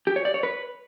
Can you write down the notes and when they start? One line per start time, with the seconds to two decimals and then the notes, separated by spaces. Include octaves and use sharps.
0.07 G4
0.16 C#5
0.25 D5
0.34 C#5
0.43 B4